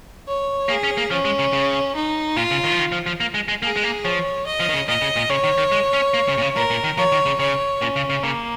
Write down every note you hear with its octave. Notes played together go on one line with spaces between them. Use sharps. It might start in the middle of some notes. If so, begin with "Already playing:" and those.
C#5
A#3 G#4
C#4
A#3
F3 C#4
G#3
C#3
C#3
D#4
A#2 F4
C#3
D#3
F3
D#3
F3
F3
A#3
G#3
G#3
A#3 G#4
G#3
A#3
F3 C#5
D#5
F3
D#3
C#3
A#2 D#5
C#3
A#2
C#3 C#5
D#3
D#3
G#3
C#4
A#3
C#3
A#2
C#3
A#2 A#4
A#2
D#3
F3 C#5
D#3
C#3
C#3 C#5
A#2 C#4
C#3
C#3
C#3 A#3